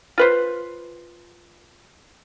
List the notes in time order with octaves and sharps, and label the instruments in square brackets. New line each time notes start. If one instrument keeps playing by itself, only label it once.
[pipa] F4 B4 C5